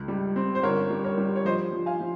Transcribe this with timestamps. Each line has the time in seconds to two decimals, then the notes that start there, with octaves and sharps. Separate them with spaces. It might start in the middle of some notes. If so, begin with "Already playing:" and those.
Already playing: C#2
0.08 G3
0.36 C4
0.55 C5
0.63 G1 A#4 C#5
0.90 G3
1.04 A#4 C#5
1.18 G3
1.36 C#5
1.45 F3 C5 D#5
1.73 F3
1.86 F5 G#5
2.00 F3